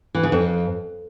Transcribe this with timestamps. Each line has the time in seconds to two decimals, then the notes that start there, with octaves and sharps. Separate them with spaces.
0.15 E3
0.23 C#3
0.32 F2